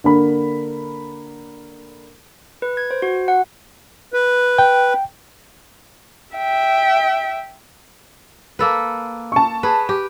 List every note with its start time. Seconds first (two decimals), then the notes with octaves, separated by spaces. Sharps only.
0.04 D3 A#3 B5
2.62 B4
2.77 G#6
2.91 C5
3.02 F#4
3.28 F#5
4.13 B4
4.58 G5
6.37 E5 G5
8.59 A#3 A4 B4
9.32 A5 C#6
9.63 G#4 B4
9.89 G4